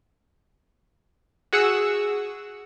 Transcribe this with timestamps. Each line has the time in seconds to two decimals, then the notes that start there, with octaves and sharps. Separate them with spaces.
1.53 F#4 G#4 F#5 C#6 E6